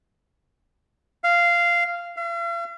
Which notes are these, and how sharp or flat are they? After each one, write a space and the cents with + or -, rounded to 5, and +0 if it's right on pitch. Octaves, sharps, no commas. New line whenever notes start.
F5 -10
F5 -45